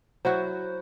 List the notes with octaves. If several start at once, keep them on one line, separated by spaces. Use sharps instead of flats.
F#3 E4 F#4 C5